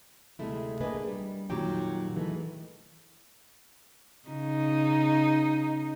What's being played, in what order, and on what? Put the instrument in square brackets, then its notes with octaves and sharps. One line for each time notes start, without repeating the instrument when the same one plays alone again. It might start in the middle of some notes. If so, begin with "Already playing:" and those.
[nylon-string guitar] D2 C3 G#3 A3 E4
A#3 D4 G#4 B4 D#5
G3
F2 A#2 D#3 F#3 G4 G5
D#3 E3 G#3 A3
[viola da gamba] C#3 D#4